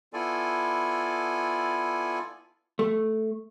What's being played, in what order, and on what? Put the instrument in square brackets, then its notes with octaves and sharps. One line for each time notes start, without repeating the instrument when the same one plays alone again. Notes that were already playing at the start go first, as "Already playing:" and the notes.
[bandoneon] B3 E4 F4 A4 D5 G#5
[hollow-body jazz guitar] A3